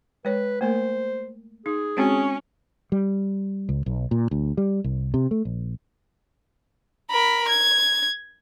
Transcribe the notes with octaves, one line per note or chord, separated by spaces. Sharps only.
G#3 B4 C#5
A3 A#3 A#4 C5
D#4 G#4
G#3 C4 C#4 F#4
G3
C#2
B1
A#2
D2
G3
C2
C3
A3
A#1
A#4 B5
G#6